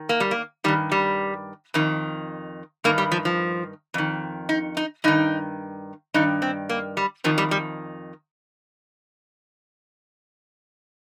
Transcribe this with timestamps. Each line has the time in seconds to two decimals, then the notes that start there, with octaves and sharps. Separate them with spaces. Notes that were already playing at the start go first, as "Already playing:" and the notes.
Already playing: D#3
0.09 A#3
0.20 G3
0.31 A#3
0.64 D#3 G3
0.68 G2
0.92 G3
1.74 F2 D#3
2.84 G2 D#3 A#3
2.98 G3
3.12 F3
3.25 F3
3.94 F2 D#3
4.49 D#4
4.77 D#4
5.04 G2 D#3 D#4
6.14 G2 D#3 D#4
6.42 C4
6.69 A#3
6.97 G3
7.24 F2 D#3 F3
7.38 G3
7.51 G3